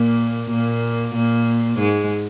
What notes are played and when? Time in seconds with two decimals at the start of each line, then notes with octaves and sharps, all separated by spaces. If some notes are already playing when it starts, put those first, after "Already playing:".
Already playing: A#2 A#3
0.50 A#2 A#3
1.14 A#2 A#3
1.79 G#2 G#3